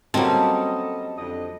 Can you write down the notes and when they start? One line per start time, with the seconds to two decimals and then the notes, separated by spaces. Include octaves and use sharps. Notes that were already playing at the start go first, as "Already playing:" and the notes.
0.14 F#3 G3 A#3 C4 C#4 A4 D#5 A5
1.18 F2 D3 D#5